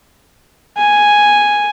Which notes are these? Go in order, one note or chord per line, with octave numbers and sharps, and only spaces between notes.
G#5